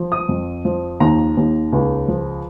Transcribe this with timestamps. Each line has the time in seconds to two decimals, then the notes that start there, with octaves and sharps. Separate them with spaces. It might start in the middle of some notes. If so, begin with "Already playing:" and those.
Already playing: F3
0.12 D#6
0.29 F2
0.65 F3
1.00 D#2 A#5
1.37 D#2
1.72 C#2
2.08 F3